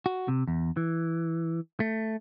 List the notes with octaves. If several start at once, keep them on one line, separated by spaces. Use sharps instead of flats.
F#4
C3
E2
E3
A3